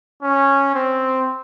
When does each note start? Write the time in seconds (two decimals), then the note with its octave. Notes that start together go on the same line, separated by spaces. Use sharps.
0.22 C#4
0.74 C4